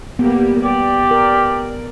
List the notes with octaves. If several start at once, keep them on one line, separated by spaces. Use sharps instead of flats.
G3 A#3 B3 G4
G4 D5
A#4